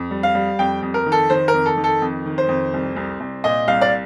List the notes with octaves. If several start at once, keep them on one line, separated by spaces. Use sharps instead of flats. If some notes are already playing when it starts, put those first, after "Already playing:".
Already playing: F2
G3
F5
G3
F2 G5
F2
A#4
D#3
A4
D#3 C5
A#4
F2
A4
D#3
A4
F2
D#3
C5
F2
C2
C2
C2
A#2 D#5
C2 F5
D5